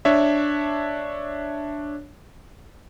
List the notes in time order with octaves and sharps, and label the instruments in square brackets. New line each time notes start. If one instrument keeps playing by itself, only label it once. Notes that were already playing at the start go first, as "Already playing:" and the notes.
[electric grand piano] D4 C#5 E5